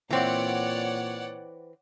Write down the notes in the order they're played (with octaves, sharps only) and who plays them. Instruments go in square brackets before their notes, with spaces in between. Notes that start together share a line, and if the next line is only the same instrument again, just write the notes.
[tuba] A#2 [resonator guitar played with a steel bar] E3 C4 [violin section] C#5 D5 F#5